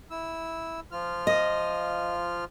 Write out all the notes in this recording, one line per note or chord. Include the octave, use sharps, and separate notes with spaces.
E4 E6
F3 F4 F6
D#5